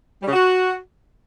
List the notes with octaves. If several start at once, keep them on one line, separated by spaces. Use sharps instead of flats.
G3
C#3
F#4